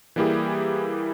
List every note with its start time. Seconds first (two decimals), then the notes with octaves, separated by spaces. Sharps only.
0.16 E3 G3 A#3 E4 G4 G#4